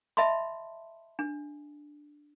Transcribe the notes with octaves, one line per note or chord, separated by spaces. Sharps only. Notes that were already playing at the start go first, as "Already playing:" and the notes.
D#5 E5 A5 B5 C6
D4